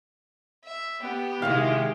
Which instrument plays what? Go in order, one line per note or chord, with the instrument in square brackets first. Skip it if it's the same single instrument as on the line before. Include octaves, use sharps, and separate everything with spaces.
[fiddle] E5
[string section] B3 [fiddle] G4
[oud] C3 E4 F#4 [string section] D#3 G#3 [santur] F5